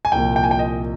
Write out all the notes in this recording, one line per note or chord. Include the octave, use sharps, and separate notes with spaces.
G#5
C2 A#2 F3 G5
G5
G#5
G5
D#5